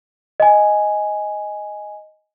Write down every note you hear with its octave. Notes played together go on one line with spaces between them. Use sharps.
D#5 G#5